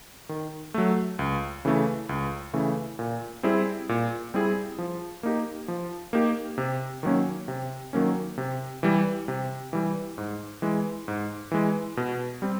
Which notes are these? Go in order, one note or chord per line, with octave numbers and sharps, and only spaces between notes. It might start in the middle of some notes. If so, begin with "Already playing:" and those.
D#3
F#3 A3
C#2
C#3 E3 A3
C#2
C#3 E3 A3
A#2
G3 C4 E4 G#4
A#2
G3 C4 E4 G#4
F3
A#3 D#4 G4
F3
A#3 D#4 G4
C3
D#3 F#3 A#3 C#4
C3
D#3 F#3 A#3 C#4
C3
E3 G3
C3
E3 G3
G#2
E3 G#3
G#2
E3 G#3
B2
G3 C4